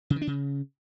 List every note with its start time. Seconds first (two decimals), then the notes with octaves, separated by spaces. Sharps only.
0.10 C#3
0.16 D#3
0.22 D4
0.27 C#3